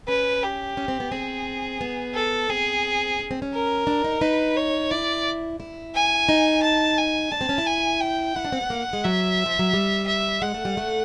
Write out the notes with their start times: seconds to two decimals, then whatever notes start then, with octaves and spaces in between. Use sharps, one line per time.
0.08 C#4 B4
0.43 G4
0.77 C#4
0.88 C4
1.00 B3
1.12 C4 G#4
1.81 B3
2.15 A4
2.49 C4 G#4
3.19 C#4
3.31 C4
3.42 C#4
3.54 A#4
3.87 D4
4.04 D#4
4.21 D#4 B4
4.57 C#5
4.91 E4 D5
5.60 E4
5.95 G#5
6.29 D#4
6.63 A5
6.98 G#5
7.32 D4 A5
7.41 C4
7.49 C#4
7.58 E4
7.67 G#5
8.01 G5
8.35 E4 F#5
8.45 D4
8.52 C4
8.61 B3
8.70 A#3
8.93 G#3
9.05 F#3 E5
9.46 F3
9.59 F#3
9.74 G3
10.07 E5
10.42 G#3 F#5
10.54 A3
10.65 G3
10.77 A3